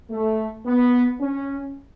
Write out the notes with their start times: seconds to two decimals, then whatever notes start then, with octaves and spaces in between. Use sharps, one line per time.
0.10 A3
0.66 B3
1.21 C#4